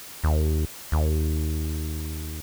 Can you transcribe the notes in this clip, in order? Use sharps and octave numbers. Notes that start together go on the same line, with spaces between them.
D#2
D#2